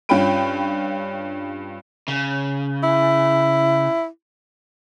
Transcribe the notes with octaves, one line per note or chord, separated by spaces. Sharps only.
G2 C#4 F4 G5 B5 D7
C#3
E4